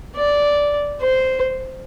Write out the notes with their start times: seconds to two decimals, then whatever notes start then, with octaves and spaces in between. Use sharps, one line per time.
0.16 D5
1.01 C5